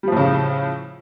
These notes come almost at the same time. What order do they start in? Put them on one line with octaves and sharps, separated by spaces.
G3 F3 A2 C#3